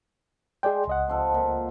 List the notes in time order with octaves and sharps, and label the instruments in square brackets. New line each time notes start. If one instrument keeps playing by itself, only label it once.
[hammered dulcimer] G#3 [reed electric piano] G#4 D5 G5
[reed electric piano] C#2 D#5 F#5
[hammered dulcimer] C3 F3 A4
A#2